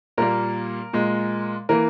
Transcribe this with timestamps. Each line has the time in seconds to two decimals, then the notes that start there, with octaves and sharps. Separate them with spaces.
0.18 A#2 G3 A#3 A#4
0.93 A#2 G#3
1.69 E3 A#3 A#4